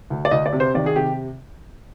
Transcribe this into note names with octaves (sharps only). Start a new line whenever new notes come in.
D2
D5
D2 D#5
D5
C3
C5
D#3 D5
G#4
C3 G4